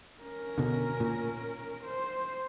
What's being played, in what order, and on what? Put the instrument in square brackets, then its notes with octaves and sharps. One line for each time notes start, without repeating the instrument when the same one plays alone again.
[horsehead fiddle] C#4 A#4
[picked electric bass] B2 D3
A#2
[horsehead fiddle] C5